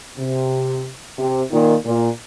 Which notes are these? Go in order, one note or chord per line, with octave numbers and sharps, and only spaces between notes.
C3
C3
A#2 D#3
A#2